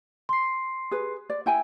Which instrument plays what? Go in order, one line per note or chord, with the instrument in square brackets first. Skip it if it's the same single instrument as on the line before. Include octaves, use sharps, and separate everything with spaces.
[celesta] C6 C7
[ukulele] G#4 B4
D5
E4 G5 G#5